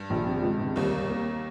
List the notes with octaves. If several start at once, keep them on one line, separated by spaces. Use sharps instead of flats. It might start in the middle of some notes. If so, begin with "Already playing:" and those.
Already playing: G2 G3
A#1
C3
C#2
C3
D#2 D#3 G3
G3
A#3